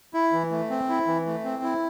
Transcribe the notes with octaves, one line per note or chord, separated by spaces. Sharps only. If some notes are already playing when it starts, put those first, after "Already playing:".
E4
E3
A3
C4
E4
E3
A3
C4
E4